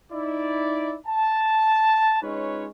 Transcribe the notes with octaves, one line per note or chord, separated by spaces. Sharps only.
D#4 E4 D5
A5
G#3 C#4 D#4 F4 B4 C#5